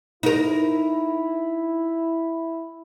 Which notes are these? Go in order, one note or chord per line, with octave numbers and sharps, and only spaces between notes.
D#4 E4 A#4